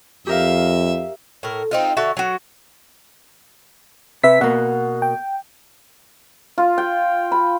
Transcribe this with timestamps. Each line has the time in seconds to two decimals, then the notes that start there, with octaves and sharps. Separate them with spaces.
0.27 F2 G4 A#4 E5 F5
1.43 A2 A#4
1.71 C4 D#4 F4
1.97 D3 F#4 E5 A5
2.17 F#3 F#4
4.24 C3 B4 E5 B6
4.41 B2 A#3 F#5
5.02 G5
6.58 F4
6.78 G5
7.32 B5